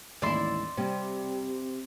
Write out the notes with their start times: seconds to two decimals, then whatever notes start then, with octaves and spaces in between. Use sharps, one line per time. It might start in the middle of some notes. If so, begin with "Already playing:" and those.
0.22 A1 D#2 G#3 E4 D5 E5 C6
0.77 C3 G3 C4